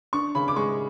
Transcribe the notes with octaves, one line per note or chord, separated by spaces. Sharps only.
D4 C#6
C#3 B5
D6
G#3 C#6